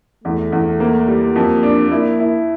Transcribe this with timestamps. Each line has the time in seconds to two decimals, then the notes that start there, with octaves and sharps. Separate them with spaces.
0.24 E2 A3
0.52 E2
0.80 A#3
1.07 G3
1.35 F2 A#3
1.63 D4
1.91 A#3 E4
2.19 E4